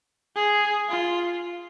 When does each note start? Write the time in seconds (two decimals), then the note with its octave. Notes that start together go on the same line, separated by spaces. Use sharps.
0.36 G#4
0.89 F4